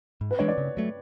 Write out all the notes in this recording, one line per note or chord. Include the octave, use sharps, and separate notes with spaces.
G#2
B4
E3 G#3 D4 C#5
D5
C#3
F#3 A3